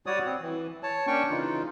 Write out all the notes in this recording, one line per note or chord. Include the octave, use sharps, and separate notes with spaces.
G3 F#4 C#5 D5 D#6
C4
E3
C#5 A5
A#3 C#4 D4 G5 C#6
C#3 E3 D#4 F4